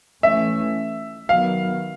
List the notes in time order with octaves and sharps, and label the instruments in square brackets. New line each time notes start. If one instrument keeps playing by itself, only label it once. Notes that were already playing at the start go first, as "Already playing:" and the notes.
[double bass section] E3 A3 C#4 [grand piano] E5
[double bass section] D#3 F#3 B3 [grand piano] F5